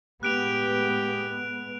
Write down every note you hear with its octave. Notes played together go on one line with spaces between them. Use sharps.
A2 G#3 B3 G4 F#6 D7 F7